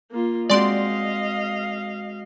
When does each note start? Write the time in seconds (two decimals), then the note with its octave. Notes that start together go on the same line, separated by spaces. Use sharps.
0.11 A#3 F4
0.50 G#3 C4 F#4 D5 D#5 F5 C6